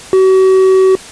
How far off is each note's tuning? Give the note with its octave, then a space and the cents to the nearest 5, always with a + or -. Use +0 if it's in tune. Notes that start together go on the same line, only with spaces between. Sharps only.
F#4 +40